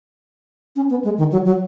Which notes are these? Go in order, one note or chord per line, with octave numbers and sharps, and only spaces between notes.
C#4
B3
G#3
D#3
F#3
F#3